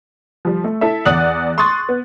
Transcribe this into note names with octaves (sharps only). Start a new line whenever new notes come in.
F3 G3
A3
E4 A4 E5
E2 D5 F#5 D#6 F#6 F#7
C6 C#6 D#6 F#6 A6
B3